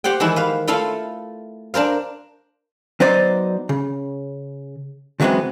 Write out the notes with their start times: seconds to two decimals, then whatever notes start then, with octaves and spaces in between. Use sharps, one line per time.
0.04 G4 C5 F#5 G5
0.20 D#3 E3 G#3 E4
0.36 B4 F5
0.67 A3 E4 F4 A4 F5
1.74 D4 A#4 C5 F5
3.00 F#3 B3 D#4 C5 D5
3.69 C#3
5.20 C#3 E3 F#3 G#3 B3 C4